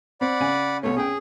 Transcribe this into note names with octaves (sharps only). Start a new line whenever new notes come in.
C4 D5 F#5 B5
C#3 G#5
C2 B2 A3 C#5
C#4 G#4 G5